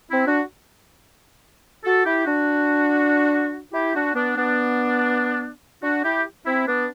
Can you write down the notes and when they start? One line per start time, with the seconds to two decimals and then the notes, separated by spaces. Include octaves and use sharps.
0.11 C4 E4
0.26 D4 F#4
1.84 F#4 A4
2.05 E4 G4
2.25 D4 F#4
3.72 E4 G4
3.94 D4 F#4
4.14 B3 D4
4.36 B3 D4
5.82 D4 F#4
6.03 E4 G4
6.45 C4 E4
6.67 B3 D4